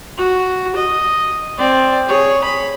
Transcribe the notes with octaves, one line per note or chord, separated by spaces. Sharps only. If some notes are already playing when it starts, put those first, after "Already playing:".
F#4
D#5
C4 D5
G#4 C#5
B5